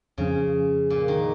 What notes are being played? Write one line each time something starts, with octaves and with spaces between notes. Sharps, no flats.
F2 C#3 F3 A#3 C#4
A#2
D#3